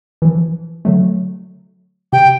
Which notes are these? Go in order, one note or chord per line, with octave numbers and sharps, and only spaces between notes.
E3 F3
D3 F#3 A3
C3 G5